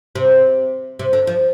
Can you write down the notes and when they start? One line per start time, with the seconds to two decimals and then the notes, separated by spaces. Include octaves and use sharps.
0.15 C3
0.99 C3
1.13 D3
1.27 F3